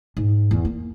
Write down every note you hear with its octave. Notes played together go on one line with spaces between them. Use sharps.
G#2
E2
A#3